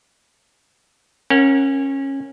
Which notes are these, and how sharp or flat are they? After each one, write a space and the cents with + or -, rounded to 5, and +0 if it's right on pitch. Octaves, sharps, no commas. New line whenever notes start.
C#4 -20 A#4 +0 F#5 -5